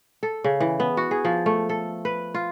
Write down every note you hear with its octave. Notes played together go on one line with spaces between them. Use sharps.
A4
C#3
E3
B3
F#4
G#4
F3
A3
A4
B4
F4